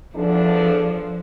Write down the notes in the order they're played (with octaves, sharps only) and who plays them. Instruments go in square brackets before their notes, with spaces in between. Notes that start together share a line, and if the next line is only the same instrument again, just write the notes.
[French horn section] E2 D4 A4 [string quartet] F3